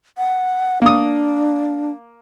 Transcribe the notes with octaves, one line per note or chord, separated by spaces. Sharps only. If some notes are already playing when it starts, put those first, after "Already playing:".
F#5
A#3 D4 D#6